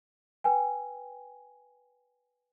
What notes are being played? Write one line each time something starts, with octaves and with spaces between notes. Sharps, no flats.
B4 G5 G#5